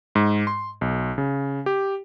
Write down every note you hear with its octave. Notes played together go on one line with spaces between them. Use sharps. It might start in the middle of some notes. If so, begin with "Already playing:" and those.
G#2
C6
B1
C#3
G4